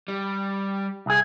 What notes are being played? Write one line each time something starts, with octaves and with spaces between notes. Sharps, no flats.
G3
C2 G#4